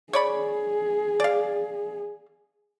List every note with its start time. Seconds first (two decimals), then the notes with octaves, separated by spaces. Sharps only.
0.13 G#4 C#5 D5 B5
1.20 D5 F5